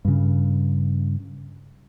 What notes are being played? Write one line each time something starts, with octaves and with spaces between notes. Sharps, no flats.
G2 C#3